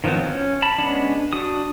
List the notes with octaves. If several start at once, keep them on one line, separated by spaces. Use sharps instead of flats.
D#3 F3 F#3 B3 C4
C#4
A5 B5
G#3 B3 C#4 D4
D4 F#4 D#6